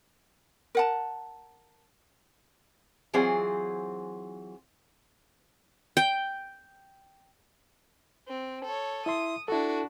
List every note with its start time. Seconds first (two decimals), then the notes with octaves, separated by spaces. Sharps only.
0.75 A#4 F#5 A5
3.14 E3 F#3 C4 F4 G#4 C5
5.97 G5
8.28 C4
8.65 A4 C#5
9.06 E4 E5 C6 D#6
9.48 D4 E4 F#4 A4